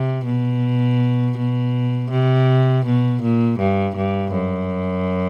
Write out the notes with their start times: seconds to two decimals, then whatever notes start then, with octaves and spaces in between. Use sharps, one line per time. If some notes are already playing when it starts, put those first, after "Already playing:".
Already playing: C3
0.25 B2
1.38 B2
2.11 C3
2.86 B2
3.22 A#2
3.59 G2
3.96 G2
4.33 F#2